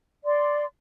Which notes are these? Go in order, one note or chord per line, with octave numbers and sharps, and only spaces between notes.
D5 C6